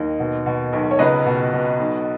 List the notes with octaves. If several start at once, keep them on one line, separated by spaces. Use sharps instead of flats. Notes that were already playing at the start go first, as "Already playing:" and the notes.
Already playing: D#2 D#3 D#5
B2
B2
B1
C#5
C#2 B4 D#5
B2
B2
B1